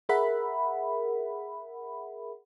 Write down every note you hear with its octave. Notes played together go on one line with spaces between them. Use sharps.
G#4 A#4 E5 F#5 B5